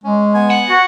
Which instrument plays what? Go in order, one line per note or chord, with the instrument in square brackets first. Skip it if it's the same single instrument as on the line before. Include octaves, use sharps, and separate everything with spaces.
[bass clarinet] G#3 [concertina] C#4
[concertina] B3 G#5
[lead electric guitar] F#5
[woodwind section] F#4